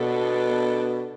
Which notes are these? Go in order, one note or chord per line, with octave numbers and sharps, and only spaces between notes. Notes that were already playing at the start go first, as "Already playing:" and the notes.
Already playing: B2 B3 D4 A4